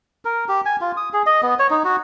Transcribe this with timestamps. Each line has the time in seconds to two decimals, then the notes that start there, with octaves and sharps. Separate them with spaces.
0.25 A#4
0.49 G4
0.65 G#5
0.81 F4
0.97 D#6
1.13 G#4
1.26 D#5
1.43 B3
1.59 C#5
1.70 D#4
1.84 F#4